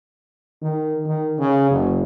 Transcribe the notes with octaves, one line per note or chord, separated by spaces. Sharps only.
D#3
D#3
C#3
F#1